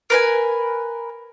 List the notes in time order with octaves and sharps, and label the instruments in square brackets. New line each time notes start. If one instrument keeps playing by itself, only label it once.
[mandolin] A#4 B4 G#5